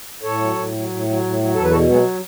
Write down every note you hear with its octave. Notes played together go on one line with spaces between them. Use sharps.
A2 A4 C#5
F#3
A2
F#3
A2
F#3
A2
F#3
E2 A4
B4
B2 F#4 A4
F#3 G#3 B3